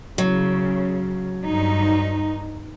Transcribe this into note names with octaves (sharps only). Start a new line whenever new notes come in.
C#3 F#3
G2 D#4